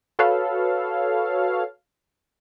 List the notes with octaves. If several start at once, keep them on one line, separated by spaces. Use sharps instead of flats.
F#4 A4 B4 C#5 F5